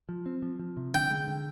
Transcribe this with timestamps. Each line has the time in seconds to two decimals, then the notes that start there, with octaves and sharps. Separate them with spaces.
0.09 F3
0.26 C4
0.42 F3
0.59 F3
0.77 C3
0.94 D3 G5
1.10 G#3
1.28 D3